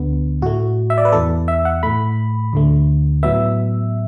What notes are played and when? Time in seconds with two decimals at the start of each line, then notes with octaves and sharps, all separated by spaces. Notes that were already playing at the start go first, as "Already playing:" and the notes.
Already playing: D2 D3 B3
0.42 A2 A3 F#4
0.90 E5
0.98 D5
1.05 B4
1.12 E2 E3 B3 A4
1.48 E5
1.65 F#5
1.83 A2 A3 B5
2.53 D2 D3 A3
3.23 A2 F#3 B3 E5